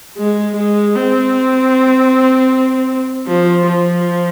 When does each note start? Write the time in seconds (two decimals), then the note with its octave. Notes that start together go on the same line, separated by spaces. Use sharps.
0.18 G#3
0.56 G#3
0.96 C4
3.28 F3
3.67 F3